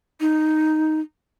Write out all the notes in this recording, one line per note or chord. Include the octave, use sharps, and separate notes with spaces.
D#4